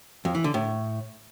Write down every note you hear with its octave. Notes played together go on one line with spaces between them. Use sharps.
F2
E3
D3
A2